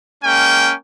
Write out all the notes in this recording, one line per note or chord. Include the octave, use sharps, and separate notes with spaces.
G#3 A#3 C#4 G5